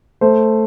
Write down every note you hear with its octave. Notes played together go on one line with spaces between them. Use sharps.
A3 C5